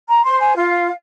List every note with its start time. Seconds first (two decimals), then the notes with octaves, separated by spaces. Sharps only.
0.08 A#5
0.24 C5 C6
0.40 G#5
0.56 F4 F5